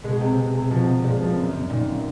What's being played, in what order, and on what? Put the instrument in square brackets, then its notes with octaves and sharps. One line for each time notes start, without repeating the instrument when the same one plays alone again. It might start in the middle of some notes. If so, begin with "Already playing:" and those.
[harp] B2 [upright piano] G#3
[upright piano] C3
C3
C3
[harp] B2 [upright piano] F3
[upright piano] C3
[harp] A#2 [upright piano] G#3
[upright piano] F3
F#2
G1
[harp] A#2 [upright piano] D#3
[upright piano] F#2